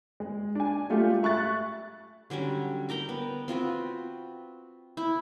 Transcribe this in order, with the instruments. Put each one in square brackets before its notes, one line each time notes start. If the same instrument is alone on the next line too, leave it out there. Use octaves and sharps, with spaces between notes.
[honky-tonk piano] G#3
D4 G#5
F#3 G#3 A3 F4 G4
E5 C#6 F#6 A6
[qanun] D3 F#3 G3 C#4
A#4 G5 A#5 D6
B3
C4 F4 F#4 B4
E4